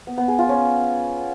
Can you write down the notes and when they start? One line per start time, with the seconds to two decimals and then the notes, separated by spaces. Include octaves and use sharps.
0.07 B3
0.18 B3
0.28 G#4
0.39 F4
0.49 C#4